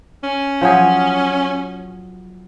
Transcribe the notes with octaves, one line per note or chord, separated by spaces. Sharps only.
C#4
F3 F#3 G#4